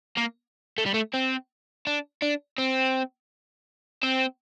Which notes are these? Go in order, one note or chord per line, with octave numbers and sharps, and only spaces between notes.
A#3
A3
G3
A3
C4
D4
D4
C4
C4